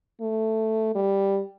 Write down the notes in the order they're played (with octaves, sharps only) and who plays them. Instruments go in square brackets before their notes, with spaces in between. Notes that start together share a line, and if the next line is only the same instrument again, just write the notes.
[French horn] A3
G3